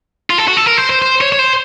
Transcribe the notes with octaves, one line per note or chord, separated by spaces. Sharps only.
F4
A4
F#4
A4
A#4
C5
C5
C5
C#5
C#5
C5